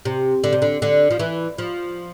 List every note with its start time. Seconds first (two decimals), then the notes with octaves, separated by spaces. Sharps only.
0.05 C3
0.44 D3
0.53 C3
0.62 D3
0.82 D3
1.11 F3
1.19 E3
1.58 F3